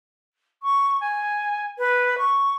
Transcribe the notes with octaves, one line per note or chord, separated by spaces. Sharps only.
C#6
G#5
B4
C#6